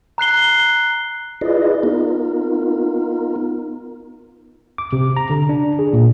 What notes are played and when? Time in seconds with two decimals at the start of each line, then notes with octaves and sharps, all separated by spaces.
0.18 A#5 F#6 C7 G7
1.41 E4 F4 G#4 B4 D5 D#5
1.83 B3 D#4 F4 A#4
4.78 D6
4.93 C3
5.17 A#5
5.30 D3
5.49 D4
5.79 G#4
5.93 A#2